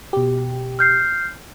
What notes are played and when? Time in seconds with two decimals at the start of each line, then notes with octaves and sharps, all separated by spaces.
0.13 B2 G4
0.79 F6 G6 C7